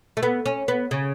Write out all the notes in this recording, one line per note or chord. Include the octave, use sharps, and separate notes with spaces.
A3
B3
C#4
B3
C#3